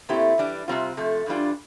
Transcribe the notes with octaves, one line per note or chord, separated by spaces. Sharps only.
A#2 A3 C4 E4 G4
E3 G3 D4
C3 G3 C4 F4
C3 F3 A3
G2 E3 G3 D4 F4